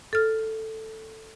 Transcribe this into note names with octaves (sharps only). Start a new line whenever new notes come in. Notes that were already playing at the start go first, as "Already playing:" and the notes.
A4 F6